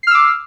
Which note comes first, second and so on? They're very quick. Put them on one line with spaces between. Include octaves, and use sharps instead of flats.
C7 F6 E6 D6